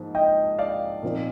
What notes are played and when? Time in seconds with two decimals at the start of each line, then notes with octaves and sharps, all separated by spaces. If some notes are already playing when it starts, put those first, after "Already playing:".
Already playing: G#2 F3 A#3 C5
0.15 D#5 G5
0.59 D5 F5
1.03 A#2 F3 C4 D#4